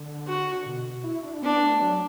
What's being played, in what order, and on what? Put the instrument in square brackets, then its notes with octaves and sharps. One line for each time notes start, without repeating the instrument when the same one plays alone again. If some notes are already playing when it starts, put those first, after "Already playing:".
Already playing: [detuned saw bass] D3
[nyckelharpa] F#4
[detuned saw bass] B2
E4
D4
[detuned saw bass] B3 [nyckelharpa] D4
[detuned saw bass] A3
F#3